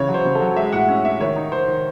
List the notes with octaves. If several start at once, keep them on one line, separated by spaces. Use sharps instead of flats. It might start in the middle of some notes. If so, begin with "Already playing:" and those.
Already playing: C#3 E3 C#5
F#3
C5
C#3
A4
F#3
G#3 E5
A2 F#5
C#4
C#4 E5
D#3 C#5
D#4
D#3 C5
D#3